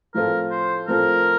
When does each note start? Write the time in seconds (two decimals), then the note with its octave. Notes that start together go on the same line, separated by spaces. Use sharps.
0.14 A2 F3 C4 F4 A4 A#4
0.50 C5
0.88 A2 F3 C4 F4 A4 A#4